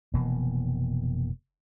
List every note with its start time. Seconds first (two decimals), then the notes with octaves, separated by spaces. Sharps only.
0.14 F1 B2 E3 A#3